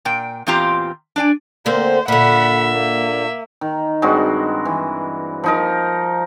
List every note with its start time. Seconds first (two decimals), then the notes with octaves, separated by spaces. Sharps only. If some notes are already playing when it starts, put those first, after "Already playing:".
0.05 A#2 G5
0.47 E2 A#2 C4 F4 G4 A#5
1.16 D4 D5 G#5
1.66 D3 A#3 C4 C5
2.08 A#2 D3 E5 F#5 B5
2.72 A#3
3.61 D#3
4.02 G2 G#3 C4 F#4
4.65 E3
5.44 F3 D#4 A#4